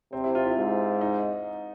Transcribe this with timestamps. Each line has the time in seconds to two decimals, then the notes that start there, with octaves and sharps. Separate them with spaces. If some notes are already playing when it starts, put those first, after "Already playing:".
0.13 C3 C4
0.24 E4
0.35 F4
0.45 E4
0.57 G#2
1.01 D#4